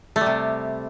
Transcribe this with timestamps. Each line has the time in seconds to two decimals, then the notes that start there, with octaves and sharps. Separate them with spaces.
0.16 A3
0.21 G3
0.26 C3